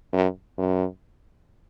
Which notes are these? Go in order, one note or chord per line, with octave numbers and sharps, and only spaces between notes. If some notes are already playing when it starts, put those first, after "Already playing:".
F#2
F#2